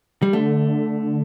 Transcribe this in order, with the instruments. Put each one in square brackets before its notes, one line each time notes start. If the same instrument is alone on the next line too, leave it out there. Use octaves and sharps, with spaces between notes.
[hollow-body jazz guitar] G3
[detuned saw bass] D3 [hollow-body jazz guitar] A3